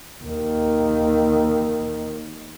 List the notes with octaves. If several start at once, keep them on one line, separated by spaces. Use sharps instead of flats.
D#2 D#3